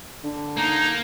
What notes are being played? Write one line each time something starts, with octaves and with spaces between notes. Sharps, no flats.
D3
A#3 D#4